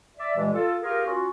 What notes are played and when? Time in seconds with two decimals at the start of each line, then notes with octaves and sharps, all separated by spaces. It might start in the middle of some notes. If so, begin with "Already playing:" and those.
0.17 D5 E5
0.36 G2 A#2 E3 G#3
0.53 F4 A4
0.82 F4 G4 G#4 A#4
1.06 C#4 F4 F#4